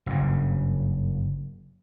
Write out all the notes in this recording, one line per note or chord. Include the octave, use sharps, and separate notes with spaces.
F#1 G2 C#3